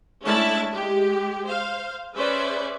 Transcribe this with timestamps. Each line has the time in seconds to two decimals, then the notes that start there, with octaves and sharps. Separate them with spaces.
0.23 G#3 A3 C#4 D4 E4 A5
0.72 G#3 G4
1.46 C5 F5
2.15 C#4 G#4 B4 C5 D5 E5